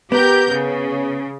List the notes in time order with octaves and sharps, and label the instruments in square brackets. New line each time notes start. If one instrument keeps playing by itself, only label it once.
[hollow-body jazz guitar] B3 [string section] G4 A#4 G6
[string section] C#3